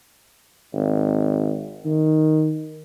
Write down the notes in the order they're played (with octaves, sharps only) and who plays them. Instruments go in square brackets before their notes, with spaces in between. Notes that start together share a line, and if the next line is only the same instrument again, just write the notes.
[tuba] G#1
D#3